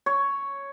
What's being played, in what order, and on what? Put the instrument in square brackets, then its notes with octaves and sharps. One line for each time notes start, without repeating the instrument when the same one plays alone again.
[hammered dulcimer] C#5